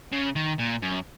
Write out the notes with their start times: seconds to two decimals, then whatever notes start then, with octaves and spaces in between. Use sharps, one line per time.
0.13 C#3
0.36 D#3
0.59 A#2
0.82 F#2